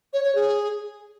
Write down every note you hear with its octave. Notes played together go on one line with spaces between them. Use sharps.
C#5
C#5
G#4